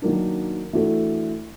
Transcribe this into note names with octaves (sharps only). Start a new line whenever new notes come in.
D#3 F#3 A#3 D4
E3 A3 D4 F#4 A4